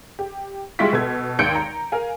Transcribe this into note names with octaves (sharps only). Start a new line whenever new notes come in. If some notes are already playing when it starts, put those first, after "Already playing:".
G4
G3 G#3 E4 F4 C#6 B6
B2 A4 G#6
G#1 D#2 D#3 G6 C#7 D7
A#5
A#4 F5 G#5